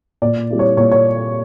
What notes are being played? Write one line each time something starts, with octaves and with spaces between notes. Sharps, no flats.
A#2 D5
G3 C4 E4
C#5
A#2 C#5
C#5